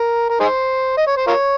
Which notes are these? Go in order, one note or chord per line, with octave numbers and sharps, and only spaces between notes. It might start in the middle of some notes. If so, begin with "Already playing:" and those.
Already playing: A#4
A#4
D#4 G#4 C5
D#5
C#5
C5
F4 A#4 C#5